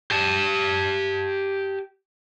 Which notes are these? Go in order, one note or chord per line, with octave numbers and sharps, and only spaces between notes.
G4 A5